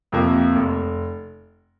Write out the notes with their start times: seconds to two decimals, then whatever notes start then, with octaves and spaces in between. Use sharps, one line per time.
0.12 F2 C3 F3 A#3
0.56 F1